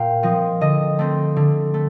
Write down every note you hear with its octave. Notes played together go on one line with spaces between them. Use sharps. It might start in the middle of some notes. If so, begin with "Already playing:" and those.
Already playing: A#2 F5 G5
F3 C4 D#5
D3 D#5
A3 C4
D3
A3